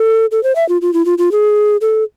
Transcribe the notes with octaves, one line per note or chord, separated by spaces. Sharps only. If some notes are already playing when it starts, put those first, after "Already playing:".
Already playing: A4
A4
C5
E5
F4
F4
E4
F4
F4
G#4
A4